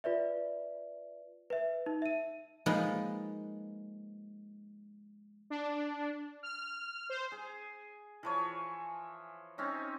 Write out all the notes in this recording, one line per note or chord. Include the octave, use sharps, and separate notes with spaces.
F4 B4 D5 E5
B4 E5
D#4
E5 D#7
F3 G#3 A#3 D#4 B4
D4
F6
C5
G#4
E3 F3 C#5
C4 C#4 D#4